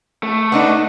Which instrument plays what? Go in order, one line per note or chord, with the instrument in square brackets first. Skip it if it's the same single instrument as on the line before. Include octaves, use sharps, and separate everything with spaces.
[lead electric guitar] A3
[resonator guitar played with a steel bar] B3 D4 D#4